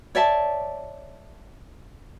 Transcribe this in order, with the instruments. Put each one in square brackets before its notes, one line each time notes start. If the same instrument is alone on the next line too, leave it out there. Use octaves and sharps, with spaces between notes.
[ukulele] C#5 D5 E5 A5